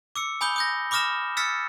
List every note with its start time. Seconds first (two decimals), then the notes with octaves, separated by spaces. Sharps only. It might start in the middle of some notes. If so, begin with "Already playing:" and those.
0.16 D6 E6 C#7
0.41 G#5 B5 D#6 G6 G7
0.56 D#6 G6 A#6
0.91 B5 D6 D#6 F6 A#6 E7
1.37 E6 F6 A6 B6 C#7